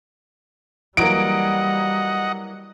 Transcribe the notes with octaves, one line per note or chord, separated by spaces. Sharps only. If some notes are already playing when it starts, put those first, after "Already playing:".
E3 F#3 G3 A#3 D#5 F#5 D7